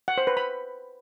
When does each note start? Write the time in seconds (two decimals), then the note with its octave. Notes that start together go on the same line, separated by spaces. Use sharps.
0.08 F#5
0.18 C5
0.27 B4
0.37 B5